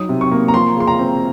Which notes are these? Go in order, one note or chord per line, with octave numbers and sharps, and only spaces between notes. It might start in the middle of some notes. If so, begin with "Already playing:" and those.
Already playing: F#3 D#4 D#6
C3
C#6
A#3
A#5
F3 C6
C#3 C6
A#5
C4